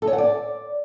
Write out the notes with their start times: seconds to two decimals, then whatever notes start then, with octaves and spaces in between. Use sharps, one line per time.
0.02 A4
0.07 C#5
0.13 F#5
0.18 D5